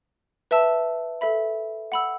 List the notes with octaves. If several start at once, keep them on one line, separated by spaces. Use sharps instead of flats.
B4 E5 A5 E6
A4 E5 B5
F#5 B5 E6